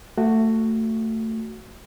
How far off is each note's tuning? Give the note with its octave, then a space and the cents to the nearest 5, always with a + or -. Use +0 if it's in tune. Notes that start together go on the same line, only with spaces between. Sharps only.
A3 +20 F#4 +0